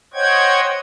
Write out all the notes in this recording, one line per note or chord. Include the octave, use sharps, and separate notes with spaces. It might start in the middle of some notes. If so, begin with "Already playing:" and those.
C5 C#5 D#5 F#5 G5 G#6